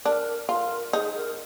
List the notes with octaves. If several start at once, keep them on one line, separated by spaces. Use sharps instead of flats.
D4 A#4
F4 A#4
D#4 G#4
A#4